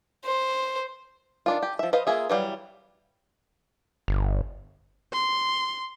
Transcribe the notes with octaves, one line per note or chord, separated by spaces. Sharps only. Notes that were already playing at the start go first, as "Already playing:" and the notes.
C5
D#3 D4 F4
G4
F3 E5
B4 C5 D#5 F5
A#3 F4 G#4 E5
E3 F#3 G3 F5
G1
C6